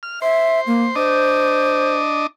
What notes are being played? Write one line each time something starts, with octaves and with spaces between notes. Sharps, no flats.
F6
C5 E5
A#3
D4 C5 D#5